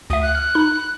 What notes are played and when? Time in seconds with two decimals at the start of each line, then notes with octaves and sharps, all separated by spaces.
0.10 D2 E5 D#6
0.22 F#6
0.35 F6
0.55 D#4 B5